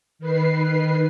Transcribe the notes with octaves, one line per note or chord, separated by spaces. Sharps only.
D#3 B4 C7